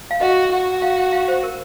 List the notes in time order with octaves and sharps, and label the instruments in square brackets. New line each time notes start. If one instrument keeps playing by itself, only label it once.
[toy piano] F5
[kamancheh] F#4 [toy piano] D#5
[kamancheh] F#4
[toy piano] F5
F5
C5
A#4